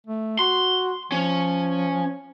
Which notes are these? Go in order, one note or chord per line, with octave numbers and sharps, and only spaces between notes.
A3
F#4 C6
F3 C#4